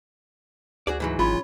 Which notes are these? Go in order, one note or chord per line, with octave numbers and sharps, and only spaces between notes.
D2 F#4 G#4 D5
G#2 E3 F#3
G#1 C#4 F4 C#5 B5